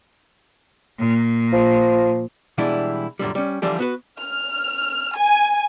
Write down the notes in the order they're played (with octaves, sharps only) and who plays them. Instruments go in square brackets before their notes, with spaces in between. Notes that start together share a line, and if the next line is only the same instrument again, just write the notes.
[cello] A#2
[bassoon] F3
[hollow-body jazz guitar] B2 E3 G3 G#3 D4 E4
F#2 A#2 D3 G3
G3 C#4
D3 E3 F3 G3 G4
B3 F#4 B4
[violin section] F6
G#5